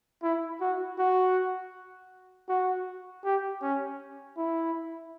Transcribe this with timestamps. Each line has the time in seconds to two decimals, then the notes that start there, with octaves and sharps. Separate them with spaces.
0.23 E4
0.61 F#4
0.98 F#4
2.49 F#4
3.25 G4
3.62 C#4
4.37 E4